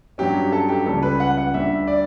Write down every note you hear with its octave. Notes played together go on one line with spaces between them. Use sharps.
G2 F#3 C#4 G4
A4
G4
C#2 C#3 G3 C#4 A4
B4
F#5
F#5
D2 D3 G3 E5
D5